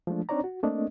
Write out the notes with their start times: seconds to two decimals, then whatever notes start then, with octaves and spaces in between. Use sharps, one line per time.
0.07 F3 G#3 A3 D4
0.29 C4 D4 D#4 C#5 D5 A#5
0.44 F#4
0.63 A3 A#3 C4 D4 D#5